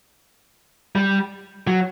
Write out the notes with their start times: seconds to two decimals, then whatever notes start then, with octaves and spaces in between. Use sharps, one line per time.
0.96 G3
1.67 F#3